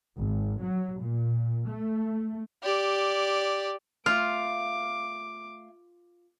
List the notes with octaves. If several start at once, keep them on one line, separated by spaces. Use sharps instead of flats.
G#1
F#3
A#2
A3
G4 D5
A3 F4 F5 D6 F6